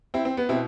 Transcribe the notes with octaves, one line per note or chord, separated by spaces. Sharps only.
C4 E4
C4
B3
B2 C4 E4